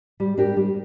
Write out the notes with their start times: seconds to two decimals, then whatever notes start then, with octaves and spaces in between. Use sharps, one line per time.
0.20 G3
0.38 D4 G4 A#4
0.57 G3